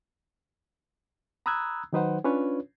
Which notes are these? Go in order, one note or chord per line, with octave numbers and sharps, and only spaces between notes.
A#5 B5 D#6 E6 F#6 G#6
D#3 F#3 D#4 B4 C5 F#5
C#4 D4 F4 B4 C#5